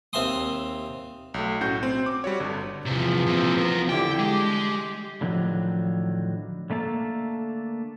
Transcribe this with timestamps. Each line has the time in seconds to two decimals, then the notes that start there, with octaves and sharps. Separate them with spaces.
0.13 D#2 C4 E5 G#5 C6 D#6
1.34 B1 A3
1.61 A2 C#4 F#4 G6
1.83 C4
2.06 D6
2.24 G3 F#4 C#5
2.40 G1 D3
2.86 E2 C3 E3 F3
3.26 A#2 C4
3.58 B3 A#4
3.89 D3 E4 G4 G5
4.19 G#3 G4
5.21 A2 D3 D#3 F3 F#3
6.70 D3 A3 A#3 A4